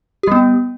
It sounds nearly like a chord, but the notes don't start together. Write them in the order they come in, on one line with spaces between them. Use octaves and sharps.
G4 G3 B3